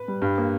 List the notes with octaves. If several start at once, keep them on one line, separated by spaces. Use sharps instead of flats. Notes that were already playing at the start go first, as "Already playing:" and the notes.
Already playing: B4
G3
G2
A#3